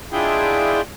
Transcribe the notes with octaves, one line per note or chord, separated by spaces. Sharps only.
G#3 D4 E4 F4 G#4 G5